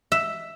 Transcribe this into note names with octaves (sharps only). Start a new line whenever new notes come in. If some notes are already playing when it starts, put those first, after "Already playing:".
E5